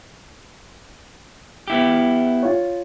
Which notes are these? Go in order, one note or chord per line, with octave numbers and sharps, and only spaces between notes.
B3 E4 G4
F4 C#5